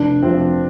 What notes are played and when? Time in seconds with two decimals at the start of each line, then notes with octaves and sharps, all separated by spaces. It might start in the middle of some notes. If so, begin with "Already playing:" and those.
Already playing: F1 D4
0.22 F2 C3 F3 C4